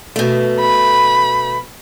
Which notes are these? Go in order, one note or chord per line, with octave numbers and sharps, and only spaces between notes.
B2 A3
B5